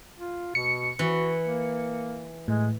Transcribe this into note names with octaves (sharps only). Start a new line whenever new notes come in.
F4
B2 C#7
E3 F#4
A#3
A2 G#3